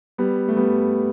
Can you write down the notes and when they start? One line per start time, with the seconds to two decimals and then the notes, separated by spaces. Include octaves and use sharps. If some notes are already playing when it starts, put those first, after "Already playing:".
0.18 G3 B3
0.48 A3
0.57 G3 B3